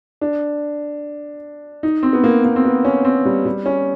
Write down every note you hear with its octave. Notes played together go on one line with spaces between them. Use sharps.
D4
D#4
C4
B3
A#3
A#3
C4
B3
C#4
C4
G3
G3
C#4